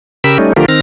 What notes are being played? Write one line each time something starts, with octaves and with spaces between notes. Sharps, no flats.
C#3 G4 A#4 B5 E6
G3 A3 C#4 D#4
D3 F3 A3 F4 G4 A#4
D#3 C4 F6 A#6